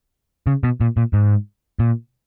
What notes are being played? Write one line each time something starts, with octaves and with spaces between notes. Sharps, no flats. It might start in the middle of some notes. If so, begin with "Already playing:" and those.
C#3
B2
A#2
A#2
G#2
A#2